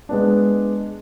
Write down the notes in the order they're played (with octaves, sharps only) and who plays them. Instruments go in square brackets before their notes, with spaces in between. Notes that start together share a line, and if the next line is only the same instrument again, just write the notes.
[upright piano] G#3 B3 D4